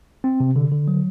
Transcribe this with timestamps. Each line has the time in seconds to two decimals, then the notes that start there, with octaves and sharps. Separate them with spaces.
0.24 C4
0.40 C3
0.56 D3
0.72 D3
0.88 F#3